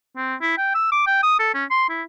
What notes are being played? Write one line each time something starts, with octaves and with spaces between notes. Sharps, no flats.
C4
E4
G5
E6
D6
G5
D#6
A4
C#4
C6
E4